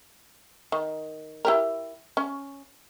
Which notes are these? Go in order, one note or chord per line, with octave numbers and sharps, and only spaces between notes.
D#3
E4 G4 A#4
C#4